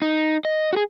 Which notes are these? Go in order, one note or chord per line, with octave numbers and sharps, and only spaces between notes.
D#4
D#5
F#4 G#4